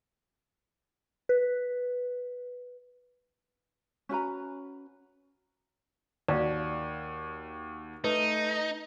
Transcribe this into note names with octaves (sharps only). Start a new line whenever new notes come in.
B4
C#4 F#4 B4 A#5
D#2 F#4 D5 F5
A3 D#4 B4